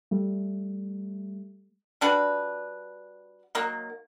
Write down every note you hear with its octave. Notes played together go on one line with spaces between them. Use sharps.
G3 A3
G3 D4 F#4 B4
D#3 F#3 A#3